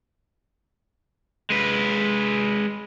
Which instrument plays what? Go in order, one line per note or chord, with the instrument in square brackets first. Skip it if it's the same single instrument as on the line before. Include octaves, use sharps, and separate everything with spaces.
[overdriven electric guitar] G#3 B4